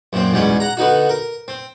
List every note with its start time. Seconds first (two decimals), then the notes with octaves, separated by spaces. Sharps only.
0.13 F#2 A#2 C4
0.33 E2 G#2 B2 G3 C#4
0.60 F#5 A#5
0.77 D3 B3 D#4 F#4
1.09 A#4
1.48 C4